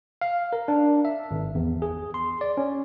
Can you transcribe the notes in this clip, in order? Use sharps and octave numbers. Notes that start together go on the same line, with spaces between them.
F5
A#4
D4
E5
G#1
E2
G#4
C6
D5
C#4